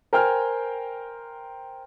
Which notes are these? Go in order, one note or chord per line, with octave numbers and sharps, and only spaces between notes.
A#4 C5 G5 G#5 F6